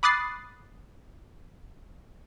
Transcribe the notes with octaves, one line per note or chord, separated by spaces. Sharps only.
B5 D6 D#6 F#6 A6 C7